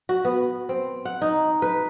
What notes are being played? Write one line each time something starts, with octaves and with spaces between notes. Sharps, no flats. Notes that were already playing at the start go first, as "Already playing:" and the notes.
F#4
B3
C4
F#5
D#4
B4